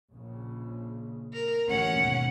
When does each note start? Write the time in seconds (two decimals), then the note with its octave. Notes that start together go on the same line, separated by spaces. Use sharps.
0.12 A#1 C#3
1.33 A#4
1.68 A1 D2 A2 C#4 F#5
1.98 D#2 G#2 B2